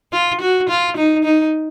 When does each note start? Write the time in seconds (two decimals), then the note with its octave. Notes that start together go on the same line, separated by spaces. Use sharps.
0.12 F4
0.41 F#4
0.69 F4
0.97 D#4
1.25 D#4